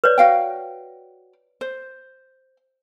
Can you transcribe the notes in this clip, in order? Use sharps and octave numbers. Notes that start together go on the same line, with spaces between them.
B4 C#5 D5
F#4 F5 G5
C5